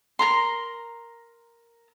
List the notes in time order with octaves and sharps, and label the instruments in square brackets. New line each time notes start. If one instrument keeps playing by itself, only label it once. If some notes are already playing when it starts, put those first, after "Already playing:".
[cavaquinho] A#4 A#5 C6